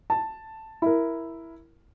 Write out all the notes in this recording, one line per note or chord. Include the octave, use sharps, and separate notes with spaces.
A5
E4 A#4